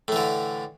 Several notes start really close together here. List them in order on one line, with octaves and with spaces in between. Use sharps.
A2 E3 D3